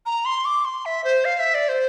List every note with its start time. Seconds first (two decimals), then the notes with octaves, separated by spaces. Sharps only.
0.06 A#5
0.25 C6
0.45 D6
0.65 C6
0.85 E5
1.04 C5
1.25 F5
1.39 E5
1.54 D5
1.69 C5